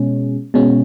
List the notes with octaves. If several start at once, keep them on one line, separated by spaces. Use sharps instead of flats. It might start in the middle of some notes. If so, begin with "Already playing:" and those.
Already playing: B2 G#3 C#4
B2 G#3 C#4